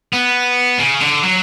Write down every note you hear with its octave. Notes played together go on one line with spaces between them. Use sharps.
B3
C#3
D3
F#3